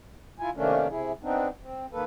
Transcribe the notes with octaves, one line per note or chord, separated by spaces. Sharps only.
E4 F4 G#5
C3 D#3 A3 A#3 C#4 D4
C3 E4 G#4
B3 C4 D4 D#4
C4
D#3 A#3 A4 B4